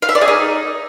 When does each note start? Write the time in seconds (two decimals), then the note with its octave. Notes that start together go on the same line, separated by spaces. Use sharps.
0.02 F5
0.09 E5
0.15 D5
0.21 G#4
0.28 D#4